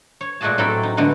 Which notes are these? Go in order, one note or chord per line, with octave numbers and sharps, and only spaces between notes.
C#5
A#2 G#3 A3 F#4 G#4 A5
A2 F#3 C4 A4 G5 B5
D#4
D3 G#3 A3 B3 D4